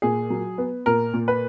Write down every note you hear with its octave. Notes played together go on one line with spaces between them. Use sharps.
A#2 G#4
F#3
B3
A#2 A#4
A#2
B4